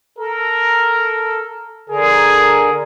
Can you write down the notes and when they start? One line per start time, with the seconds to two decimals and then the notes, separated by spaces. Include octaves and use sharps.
0.18 A4 A#4
1.89 D3 G#4 A#4